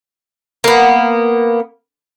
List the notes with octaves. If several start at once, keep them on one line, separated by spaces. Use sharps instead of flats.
A#3 B3